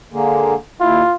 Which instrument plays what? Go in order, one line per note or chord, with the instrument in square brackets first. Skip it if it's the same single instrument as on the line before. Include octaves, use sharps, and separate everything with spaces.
[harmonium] D3 G#3 A#3
[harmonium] D#2 E4 [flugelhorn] F4